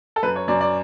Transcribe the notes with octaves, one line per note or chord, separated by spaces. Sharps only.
A4
F#2 B4
C#5
F#2 D5
D5